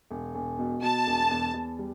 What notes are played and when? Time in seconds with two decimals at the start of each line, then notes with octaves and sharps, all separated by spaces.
0.11 E1
0.35 E1
0.59 B2
0.82 B2 A5
1.07 E1
1.31 E2
1.54 E2
1.79 G3